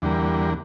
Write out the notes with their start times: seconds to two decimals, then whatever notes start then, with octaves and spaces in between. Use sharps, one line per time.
0.02 E2 D3 G3 A#3